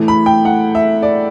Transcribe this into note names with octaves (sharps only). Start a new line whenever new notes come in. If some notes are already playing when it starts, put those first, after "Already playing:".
Already playing: A2 E3 A3
B5
G5
F#5
E5
D5